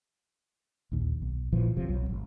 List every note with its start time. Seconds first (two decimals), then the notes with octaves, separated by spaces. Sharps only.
0.92 A#1 D#2
1.22 B1
1.52 A#1 A#2 E3 F3
1.76 E1 C3 F3
1.89 B1 F#3
2.09 G#1